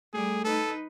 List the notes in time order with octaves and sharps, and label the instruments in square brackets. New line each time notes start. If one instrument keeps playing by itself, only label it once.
[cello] G3 [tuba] A3 [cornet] G#4
[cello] D#4 B4 [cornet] A4